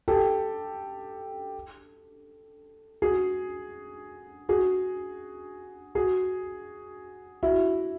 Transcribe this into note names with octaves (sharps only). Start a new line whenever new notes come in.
G4 A4
F#4 G#4
F#4 G#4
F#4 G#4
E4 F#4